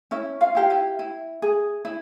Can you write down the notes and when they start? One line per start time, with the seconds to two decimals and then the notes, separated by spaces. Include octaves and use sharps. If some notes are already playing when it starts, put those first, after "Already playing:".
0.11 C#4 E4 E5
0.41 F4 F5
0.55 E4 G4 F5
0.70 E4 E5
0.99 E4
1.42 G#4
1.85 E4